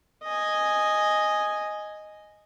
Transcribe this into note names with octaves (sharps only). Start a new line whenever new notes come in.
D#5 G#5